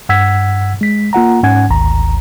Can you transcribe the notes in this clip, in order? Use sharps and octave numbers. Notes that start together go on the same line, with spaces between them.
G2 F#5 E6 G#6 B6
G#3 B6
A#3 F4 F#5 A#5
G#2 C#4 F#5 G#5 G#6
G#1 D2 A#5